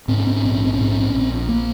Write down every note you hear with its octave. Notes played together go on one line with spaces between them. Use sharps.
G#2 C4
C#4
C4
C#4
A#1 C4
C#4
C4
C#4
G#2 C4
C#4
C4
C#4
A#1
C4
A#3